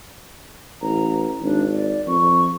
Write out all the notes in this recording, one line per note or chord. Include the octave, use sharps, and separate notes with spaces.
A1 A#5
G#1 D4
D5
F2 C#6